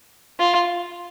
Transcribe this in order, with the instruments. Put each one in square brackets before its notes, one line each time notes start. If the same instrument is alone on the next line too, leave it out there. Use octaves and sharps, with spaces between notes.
[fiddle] F4